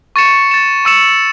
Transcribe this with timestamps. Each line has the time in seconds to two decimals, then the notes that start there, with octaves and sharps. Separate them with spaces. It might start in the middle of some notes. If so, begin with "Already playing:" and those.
0.16 C#6 A6 C#7 E7
0.51 A6 E7
0.85 C#6 E6 C#7 E7